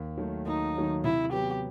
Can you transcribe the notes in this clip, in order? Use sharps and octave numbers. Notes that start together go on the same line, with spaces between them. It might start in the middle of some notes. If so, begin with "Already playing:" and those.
Already playing: D#2
D#3 F#3 A3
D#2 D#4
D#3 F#3 A3
C3 E4
F#3 B3 G4